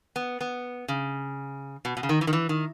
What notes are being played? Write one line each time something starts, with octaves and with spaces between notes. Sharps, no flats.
B3
B3
C#3
B2
B2
C#3
D#3
E3
D#3
E3
D#3